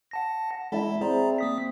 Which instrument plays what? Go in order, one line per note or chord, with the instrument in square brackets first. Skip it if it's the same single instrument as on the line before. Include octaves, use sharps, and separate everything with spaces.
[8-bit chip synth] F#5 A5 A#6
[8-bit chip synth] G#3 E4 [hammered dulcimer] E5 A5 B5
[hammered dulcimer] C4 [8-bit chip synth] G#4 D5 A#5
[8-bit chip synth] A#3 D#6 B6